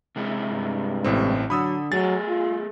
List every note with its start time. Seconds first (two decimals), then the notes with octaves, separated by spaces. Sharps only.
0.16 C3 G#3 E4
0.52 G2
1.04 A1 A2 C4
1.50 D3 F#3 B5 D#6 E6
1.92 F#3 A3 G#4 A6
2.29 F4